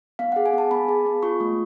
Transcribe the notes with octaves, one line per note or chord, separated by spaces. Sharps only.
B3 F5
G#4 F#5
G#5
B3 A5
B3 B5
G#4
B3
F4 C#6
A3